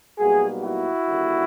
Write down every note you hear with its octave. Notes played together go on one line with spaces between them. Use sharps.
B1 B2 G3 A#3 F#4 G#4
E4 F#4
D#2 D3 G3 A#3